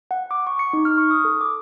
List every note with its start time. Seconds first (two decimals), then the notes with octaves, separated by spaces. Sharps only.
0.11 F#5
0.31 D6
0.47 C#6
0.59 C#7
0.73 D#4
0.85 F6
0.97 C#6
1.11 D#6
1.25 A4
1.41 D6